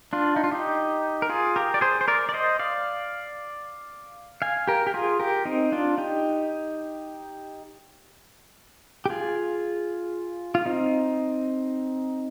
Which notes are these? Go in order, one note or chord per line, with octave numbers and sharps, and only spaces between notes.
D4 F4
D#4
F4
D#4 G4
A#4
F4 G#4
G4 A#4
D5
G#4 C5
C5
A#4 D5
D5
C5 D#5
D5 F5
F5 G#5
G4 A#4
G4
F4 G#4
G4 A#4
C4 D#4
D4 F4
D#4 G4
G4
F4 G#4
F4
C4 D#4